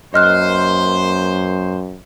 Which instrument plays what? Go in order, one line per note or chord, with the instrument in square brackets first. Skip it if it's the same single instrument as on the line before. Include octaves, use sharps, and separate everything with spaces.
[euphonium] F#2 [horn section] A#3 B4 C5 [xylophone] D#5 F6 F#6